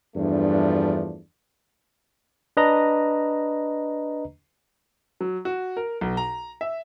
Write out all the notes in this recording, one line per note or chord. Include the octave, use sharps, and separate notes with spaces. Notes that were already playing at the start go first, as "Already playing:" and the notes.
E2 G2 F3 A3 D4
D4 B4 D#5 A#5
F#3
F#4
A#4
B1
A#5
E5